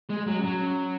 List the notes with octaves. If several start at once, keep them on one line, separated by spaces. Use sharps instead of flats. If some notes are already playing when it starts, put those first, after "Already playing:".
G#3
G#4
F#3
C#4
F#3
C#4